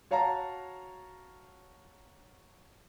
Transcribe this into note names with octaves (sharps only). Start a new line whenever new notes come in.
F#4 C#5 F5 A5 A#5